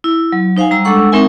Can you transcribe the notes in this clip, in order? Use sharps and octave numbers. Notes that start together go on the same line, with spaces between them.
E4
F#3
D#4 C5 F5 F#5 G#5
G3 A#5 E6
G#3 D4 A4 F#5 C#6 E6
G#3 C4 D#4 A#4 E5 G#5